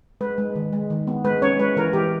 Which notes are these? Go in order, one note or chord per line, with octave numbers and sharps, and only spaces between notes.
G#3 B4
G#3
D#3
G#3
D#3
B3
G#3 B4
C#4 C#5
G#3 B4
E3 A#4
E3 G4